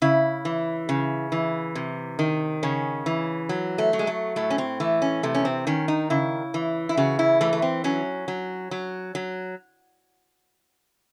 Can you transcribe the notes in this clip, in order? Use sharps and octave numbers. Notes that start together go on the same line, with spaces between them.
C#3 E4
E3
C#3
E3
C3
D#3
C#3 C#4
E3
F#3
A3
F#3
G#3
A3
A2 A3
C#4
C4
E3 A3
C#4
C3 A3
C#4
C4
D#3 C#4
D#4
C#3 E4
E3
E4
C#3 F#4
E4
E3 A3
A3
C4
F#3 C#4
F#3
F#3
F#3